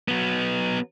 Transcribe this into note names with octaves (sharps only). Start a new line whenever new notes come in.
F#3 B3